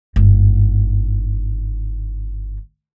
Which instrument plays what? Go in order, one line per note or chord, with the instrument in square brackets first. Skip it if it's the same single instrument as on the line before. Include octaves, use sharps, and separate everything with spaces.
[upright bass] G1 G#2